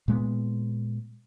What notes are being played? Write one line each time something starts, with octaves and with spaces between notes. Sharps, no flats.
A#2 G#3 A#3 B3